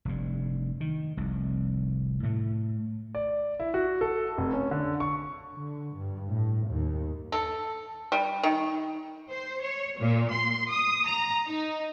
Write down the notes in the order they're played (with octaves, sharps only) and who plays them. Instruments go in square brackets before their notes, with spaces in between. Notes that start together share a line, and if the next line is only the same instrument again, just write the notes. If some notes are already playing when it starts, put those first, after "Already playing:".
[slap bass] F1 G2
D#3
F1 C2
A2 A3
[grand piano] D5
E4
F#4
A4
F1
C#4
D3
C#6
[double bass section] D3
G2
A2
D#2
[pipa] A4
G3
D#3
[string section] C5
C#5
A#2
C6
D#6
A#5
D#4